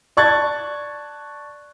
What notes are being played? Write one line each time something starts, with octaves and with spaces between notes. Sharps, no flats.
D5 A5 C#6 F#6 G#6 A6